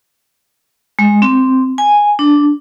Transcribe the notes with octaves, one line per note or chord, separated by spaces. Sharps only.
G#3
C4
G#5
D4